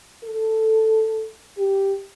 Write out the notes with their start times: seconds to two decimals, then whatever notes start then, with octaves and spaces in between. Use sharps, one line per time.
0.25 A4
1.58 G4